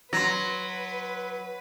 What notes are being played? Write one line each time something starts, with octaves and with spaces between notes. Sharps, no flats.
F#3 B4 C6 A#6